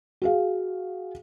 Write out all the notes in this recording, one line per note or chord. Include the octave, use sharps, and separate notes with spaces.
F#4 G#4 F5